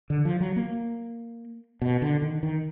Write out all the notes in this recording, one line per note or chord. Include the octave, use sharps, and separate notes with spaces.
D3
F3
F#3
A#3
B2
D3
D#3
D#3